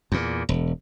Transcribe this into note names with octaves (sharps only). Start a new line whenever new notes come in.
E2 A#2
E1